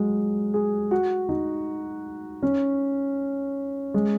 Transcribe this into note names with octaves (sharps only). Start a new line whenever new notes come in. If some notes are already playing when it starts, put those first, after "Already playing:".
Already playing: F#3 G#3
G#4
F#4
D#4
C#4
G#3